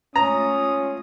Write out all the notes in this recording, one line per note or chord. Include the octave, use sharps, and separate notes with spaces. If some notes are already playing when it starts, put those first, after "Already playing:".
G#3 A3 C#4 F4 A#5 D#6